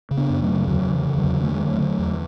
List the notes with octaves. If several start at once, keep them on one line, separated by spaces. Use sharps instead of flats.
C#3
B3 D4
F#2
F#3 A3
C#3
E2 D3 F#3
C#3
E3
C#3
D3 F#3
E2
D3 A3
G#3
D3
F#3 A3
D3
E2